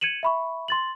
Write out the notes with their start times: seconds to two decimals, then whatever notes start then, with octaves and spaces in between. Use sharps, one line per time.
0.01 G#6 C#7 D#7 E7 F#7
0.23 E5 B5 C#6
0.68 C6 A6 F#7